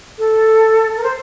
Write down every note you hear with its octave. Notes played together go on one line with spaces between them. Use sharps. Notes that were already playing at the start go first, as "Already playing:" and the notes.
A4
A#4
C5